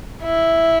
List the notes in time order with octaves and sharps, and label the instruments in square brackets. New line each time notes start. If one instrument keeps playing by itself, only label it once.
[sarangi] E4